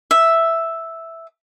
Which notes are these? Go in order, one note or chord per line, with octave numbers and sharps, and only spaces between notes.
E5